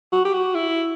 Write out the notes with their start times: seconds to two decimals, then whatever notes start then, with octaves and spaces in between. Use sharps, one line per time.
0.12 F#4
0.25 G4
0.34 F#4
0.55 E4